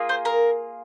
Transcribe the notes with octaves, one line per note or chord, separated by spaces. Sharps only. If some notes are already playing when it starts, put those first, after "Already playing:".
Already playing: A#3 F4 G#4
C5
A#4